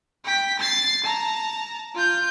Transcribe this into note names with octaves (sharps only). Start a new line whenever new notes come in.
G5 B6
A6 C7
A5 A#5
F4 G6